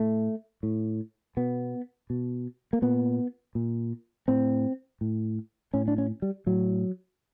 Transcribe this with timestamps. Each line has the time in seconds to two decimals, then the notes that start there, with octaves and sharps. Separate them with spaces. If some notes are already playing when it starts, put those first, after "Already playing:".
Already playing: A2 A3
0.63 A2
1.37 B2 B3
2.10 B2
2.73 A#3
2.82 A#2 B3
3.55 A#2
4.28 A2 C4
5.01 A2
5.74 A2 C#4
5.88 D4
5.98 C#4
6.22 G3
6.46 A2 F#3